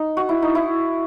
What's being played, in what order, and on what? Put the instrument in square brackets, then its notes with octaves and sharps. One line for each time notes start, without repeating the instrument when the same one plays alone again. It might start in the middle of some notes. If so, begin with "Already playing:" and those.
Already playing: [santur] D#4
F#4
E4
D#4
E4